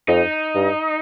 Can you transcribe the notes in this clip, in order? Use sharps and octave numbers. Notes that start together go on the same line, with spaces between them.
F2 D#4
G2